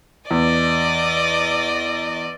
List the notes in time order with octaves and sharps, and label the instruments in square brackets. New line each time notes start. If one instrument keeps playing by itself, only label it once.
[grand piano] E2 [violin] D5 D#5